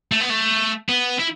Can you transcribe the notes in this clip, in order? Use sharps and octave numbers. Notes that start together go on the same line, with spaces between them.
A3
B3
A3
B3
E4